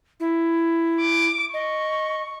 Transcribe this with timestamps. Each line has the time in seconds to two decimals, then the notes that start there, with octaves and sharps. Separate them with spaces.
0.20 E4
1.00 D6
1.54 D#5 C#6